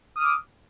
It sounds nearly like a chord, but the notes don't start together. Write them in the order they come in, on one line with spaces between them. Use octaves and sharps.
D#6 F6 D6